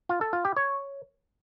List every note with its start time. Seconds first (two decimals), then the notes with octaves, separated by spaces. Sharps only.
0.09 F4
0.21 A4
0.33 F4
0.45 G4
0.56 C#5